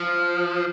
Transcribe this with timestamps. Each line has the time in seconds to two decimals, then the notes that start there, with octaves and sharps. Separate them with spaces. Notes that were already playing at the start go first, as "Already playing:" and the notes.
Already playing: F3